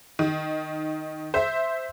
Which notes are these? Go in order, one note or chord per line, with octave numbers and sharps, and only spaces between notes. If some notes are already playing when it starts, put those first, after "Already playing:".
D#3
C5 E5